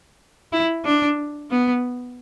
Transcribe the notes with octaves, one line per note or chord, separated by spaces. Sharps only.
E4
D4
B3